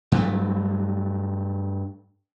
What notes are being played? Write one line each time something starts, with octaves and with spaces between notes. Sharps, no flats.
G2 F#3 A3